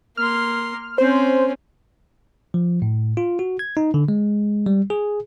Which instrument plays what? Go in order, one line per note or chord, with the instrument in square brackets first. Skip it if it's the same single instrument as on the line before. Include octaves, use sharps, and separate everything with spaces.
[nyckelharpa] A#3 C6 [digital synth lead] F6
[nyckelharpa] C4 C#4 [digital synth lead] C5
[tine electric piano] F3
A2
F4
F#4
G#6
D#4
D3
G#3
G3
G#4